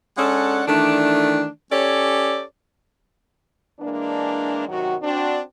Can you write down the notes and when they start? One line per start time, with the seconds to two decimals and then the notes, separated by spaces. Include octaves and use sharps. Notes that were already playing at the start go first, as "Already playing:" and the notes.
0.17 G#3 C#4 D4 A4 F#5
0.67 D#3 E3 A3 D4
1.71 C#4 G4 A4 C#5 D5
3.80 E3 G#3 A#3 D4
4.69 F#2 C3 D#3 F#3 F#4
5.03 C4 D4 F#4